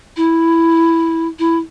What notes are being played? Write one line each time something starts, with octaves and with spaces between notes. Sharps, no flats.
E4
E4